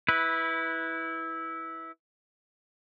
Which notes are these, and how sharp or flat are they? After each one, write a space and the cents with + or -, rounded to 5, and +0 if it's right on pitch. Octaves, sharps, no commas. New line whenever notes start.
E4 -15 B4 +0